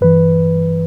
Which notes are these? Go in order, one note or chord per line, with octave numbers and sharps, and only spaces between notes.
G2 E3 B4